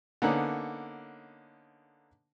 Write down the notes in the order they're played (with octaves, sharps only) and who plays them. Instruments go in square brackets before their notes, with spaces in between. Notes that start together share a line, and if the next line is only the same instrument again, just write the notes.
[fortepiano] D3 A#3 B3 C#4 D#4 F#6